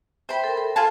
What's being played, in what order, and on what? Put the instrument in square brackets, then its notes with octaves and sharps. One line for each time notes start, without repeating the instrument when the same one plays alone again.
[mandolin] C5 B5 [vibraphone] E5 G5
[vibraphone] A4 A#4
A4
[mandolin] F4 G#4 A5